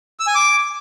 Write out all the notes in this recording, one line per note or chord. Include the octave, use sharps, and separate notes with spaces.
E6
G#5
D6